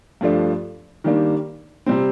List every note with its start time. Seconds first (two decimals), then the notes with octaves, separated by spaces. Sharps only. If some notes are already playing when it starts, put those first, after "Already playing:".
0.21 G2 F3 A3 D4
1.04 D#3 G3 A#3 D4
1.86 C3 G3 C4